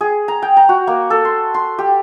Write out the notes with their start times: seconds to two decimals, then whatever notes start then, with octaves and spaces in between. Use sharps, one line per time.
0.01 G#4
0.28 A#5
0.42 G5
0.57 A#5
0.69 F#4
0.87 A#3
1.10 A4
1.25 C6
1.54 C6
1.79 G4